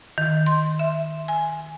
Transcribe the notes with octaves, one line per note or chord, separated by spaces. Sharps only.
D#3
C6
E5
G#5